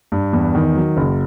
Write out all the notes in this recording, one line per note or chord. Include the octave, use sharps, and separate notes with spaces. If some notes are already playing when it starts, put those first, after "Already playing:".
G2
E2
D#3
F#3
F#1